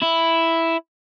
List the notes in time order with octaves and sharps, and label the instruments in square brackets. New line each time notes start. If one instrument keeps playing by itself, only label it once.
[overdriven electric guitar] E4